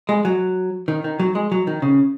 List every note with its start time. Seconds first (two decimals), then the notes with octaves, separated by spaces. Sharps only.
0.09 G#3
0.25 F#3
0.88 D#3
1.04 D#3
1.20 F#3
1.35 G#3
1.52 F#3
1.67 D#3
1.82 C#3